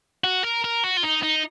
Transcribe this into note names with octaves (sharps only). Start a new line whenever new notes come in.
F#4
A#4
A#4
F#4
F4
D#4
D#4